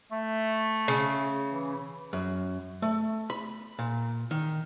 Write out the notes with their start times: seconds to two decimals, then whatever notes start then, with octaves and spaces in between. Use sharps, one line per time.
0.12 A3
0.88 C#3
1.49 E3
2.13 F#2
2.82 A3
3.30 B5
3.79 A#2
4.31 D#3